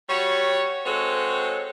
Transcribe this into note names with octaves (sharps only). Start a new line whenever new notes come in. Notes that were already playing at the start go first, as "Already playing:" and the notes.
G3 F#4 C#5
G#3 C4 F#4 A4 C#5